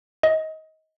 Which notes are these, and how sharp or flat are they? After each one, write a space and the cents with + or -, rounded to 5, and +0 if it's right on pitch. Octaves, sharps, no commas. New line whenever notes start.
D#5 +25